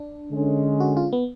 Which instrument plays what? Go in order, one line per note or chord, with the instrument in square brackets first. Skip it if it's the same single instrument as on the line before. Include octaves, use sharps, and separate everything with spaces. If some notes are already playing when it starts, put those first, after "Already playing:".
Already playing: [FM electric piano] D4
[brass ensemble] D3 G#3 C#4
[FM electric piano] F#4
F4
B3